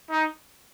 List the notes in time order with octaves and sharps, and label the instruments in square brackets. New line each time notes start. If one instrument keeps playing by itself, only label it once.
[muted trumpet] D#4